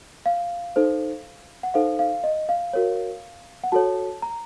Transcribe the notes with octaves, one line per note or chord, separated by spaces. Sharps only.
F5
D#4 A4 C5
F#5
D#4 A4 C5 F5
F5
D#5
F5
F#4 A#4 C#5
F#5
F#4 A4 C#5 A5
A#5